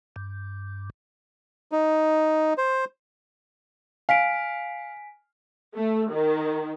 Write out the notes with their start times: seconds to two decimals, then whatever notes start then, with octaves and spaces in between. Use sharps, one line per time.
0.16 G2
1.72 D#4
2.58 C5
4.09 F5 G#5 B6 D7
5.76 A3
6.12 D#3